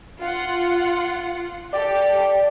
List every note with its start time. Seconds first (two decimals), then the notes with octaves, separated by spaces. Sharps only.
0.21 F4 F#5
1.73 G4 A4 D5